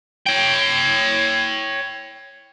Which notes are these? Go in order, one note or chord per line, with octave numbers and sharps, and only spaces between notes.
C#5 G5